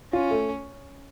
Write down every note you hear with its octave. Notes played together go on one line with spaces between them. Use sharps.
C#4 F4
A3